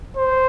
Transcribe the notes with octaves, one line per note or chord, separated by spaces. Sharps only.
C5